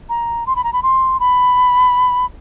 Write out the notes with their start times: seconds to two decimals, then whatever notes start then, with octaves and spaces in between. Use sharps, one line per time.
0.09 A#5
0.47 C6
0.56 B5
0.64 A#5
0.73 B5
0.83 C6
1.20 B5